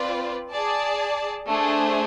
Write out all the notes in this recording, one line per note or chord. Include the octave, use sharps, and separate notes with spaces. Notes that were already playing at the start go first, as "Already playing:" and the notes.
Already playing: C4 F4 B4 D5
G#4 D5 A5
A3 D4 G#4 C5